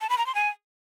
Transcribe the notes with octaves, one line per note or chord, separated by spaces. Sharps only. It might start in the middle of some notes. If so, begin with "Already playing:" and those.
A5
B5
A#5
C6
G#5